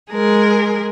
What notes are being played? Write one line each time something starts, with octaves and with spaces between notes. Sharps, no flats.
G#3 G#4 A#4